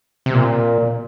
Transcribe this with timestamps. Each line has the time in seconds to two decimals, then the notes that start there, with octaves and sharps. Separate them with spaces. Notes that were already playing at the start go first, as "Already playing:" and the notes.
0.26 C3
0.34 A#2